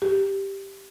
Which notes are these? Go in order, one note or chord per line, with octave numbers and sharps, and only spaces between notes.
G4